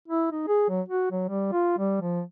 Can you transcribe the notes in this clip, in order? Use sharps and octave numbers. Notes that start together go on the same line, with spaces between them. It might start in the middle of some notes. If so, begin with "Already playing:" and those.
E4
D#4
G#4
F#3
F#4
F#3
G3
F4
G3
F3